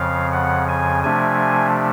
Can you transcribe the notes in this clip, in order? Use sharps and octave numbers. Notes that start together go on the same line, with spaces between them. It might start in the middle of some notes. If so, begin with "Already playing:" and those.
Already playing: F2 C#3 F3 F5
F#5
G#5
C3 F3 A3 D4 G#5